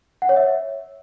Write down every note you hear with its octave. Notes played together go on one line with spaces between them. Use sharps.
F#5
C#5
E5